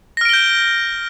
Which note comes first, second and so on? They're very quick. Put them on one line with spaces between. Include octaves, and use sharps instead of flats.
A#6 F6 D7 G7 G6